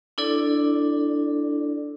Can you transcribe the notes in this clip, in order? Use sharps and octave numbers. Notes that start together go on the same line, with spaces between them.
D4 E4 A4 D5